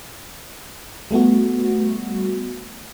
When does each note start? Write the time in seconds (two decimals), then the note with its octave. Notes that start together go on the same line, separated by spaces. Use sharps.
1.11 G3 A3 B3 F#4